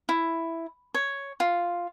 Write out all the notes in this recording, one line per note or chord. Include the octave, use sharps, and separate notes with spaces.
E4
C#5
F4